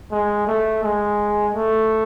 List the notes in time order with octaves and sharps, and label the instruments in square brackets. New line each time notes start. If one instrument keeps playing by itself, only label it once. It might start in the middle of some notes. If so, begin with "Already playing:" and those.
[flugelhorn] G#3
A3
G#3
A3